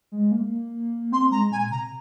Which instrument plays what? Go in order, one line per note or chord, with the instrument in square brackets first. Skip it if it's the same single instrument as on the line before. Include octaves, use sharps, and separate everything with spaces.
[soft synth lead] G#3
A#3
[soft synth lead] C4 [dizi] C6
[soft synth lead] G#3 [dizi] A#5
[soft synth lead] A#2 [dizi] G#5
[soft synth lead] C3 [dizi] A#5